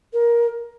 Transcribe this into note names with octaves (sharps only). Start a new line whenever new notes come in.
A#4